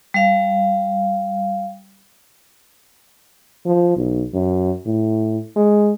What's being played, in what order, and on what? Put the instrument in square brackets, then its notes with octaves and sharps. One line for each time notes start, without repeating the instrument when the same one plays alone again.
[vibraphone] G3 F5
[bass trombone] F3
B1
F#2
A2
G#3